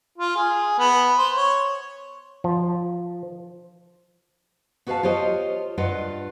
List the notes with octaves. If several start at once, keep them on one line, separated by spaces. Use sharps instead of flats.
F4
G#4
B3
C5
C#5
F3
B3 F#4 B4 C#5 F5 A5
F4 G4 C5 C#5 D#5
G2 F4 B4 D#5 F#5